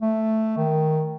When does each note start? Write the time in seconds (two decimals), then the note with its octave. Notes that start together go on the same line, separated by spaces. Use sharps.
0.01 A3
0.57 D#3